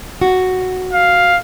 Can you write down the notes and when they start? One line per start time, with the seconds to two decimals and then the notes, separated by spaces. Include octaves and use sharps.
0.21 F#4
0.93 F5